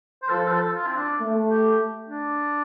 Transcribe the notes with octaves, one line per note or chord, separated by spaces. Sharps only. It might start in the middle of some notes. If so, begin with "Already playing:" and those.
C5
F3 A4
C5
A4
F4
C4
D4
A3
G4
D4